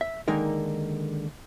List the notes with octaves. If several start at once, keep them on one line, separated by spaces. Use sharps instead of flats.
E5
D3 D#3 G#3 A#3 D#4 A#4